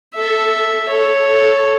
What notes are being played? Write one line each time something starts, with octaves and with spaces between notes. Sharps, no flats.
A4 E5
A4 C#5
A4